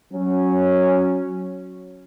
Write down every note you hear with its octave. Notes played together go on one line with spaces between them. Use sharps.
F#3 C#4